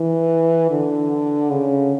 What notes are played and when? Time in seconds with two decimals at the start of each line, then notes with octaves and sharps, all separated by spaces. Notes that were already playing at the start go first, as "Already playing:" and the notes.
Already playing: E3
0.70 D3
1.51 C#3